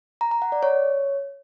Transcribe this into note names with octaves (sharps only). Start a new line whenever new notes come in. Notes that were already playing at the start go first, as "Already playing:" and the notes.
A#5
A#5
F#5
D5
C#5